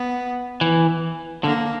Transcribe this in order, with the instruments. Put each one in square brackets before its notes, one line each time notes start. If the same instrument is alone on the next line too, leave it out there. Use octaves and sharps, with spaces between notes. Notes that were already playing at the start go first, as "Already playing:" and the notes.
Already playing: [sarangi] B3
[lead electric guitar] E3
[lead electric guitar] D3 [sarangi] A#3